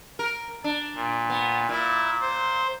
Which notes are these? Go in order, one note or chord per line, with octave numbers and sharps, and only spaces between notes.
A#4
D4
A#2
B3
A#2 E4
C5